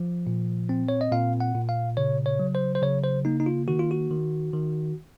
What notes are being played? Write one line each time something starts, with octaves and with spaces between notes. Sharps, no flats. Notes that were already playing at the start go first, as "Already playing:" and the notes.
Already playing: F3
A#2
C4
C#5
D#5
A#2 F5
F#5
A#2
F5
C#3 C#5
C#5
F#3
C5
C5
C#3 C#5
C5
A#3 D#4
D#4
F4
D#3 F#4
F4
F#4
D#3
D#3